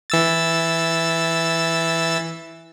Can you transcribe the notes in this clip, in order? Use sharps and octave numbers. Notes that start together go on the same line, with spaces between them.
E3 E6 A6